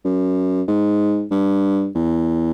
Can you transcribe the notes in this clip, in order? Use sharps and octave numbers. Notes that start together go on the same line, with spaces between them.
F#2
G#2
G2
E2